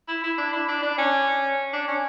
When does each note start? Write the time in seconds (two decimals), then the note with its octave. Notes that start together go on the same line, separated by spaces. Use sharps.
0.08 E4
0.23 E4
0.38 D4
0.53 E4
0.68 D4
0.82 D4
0.98 C#4
1.73 D4
1.88 C#4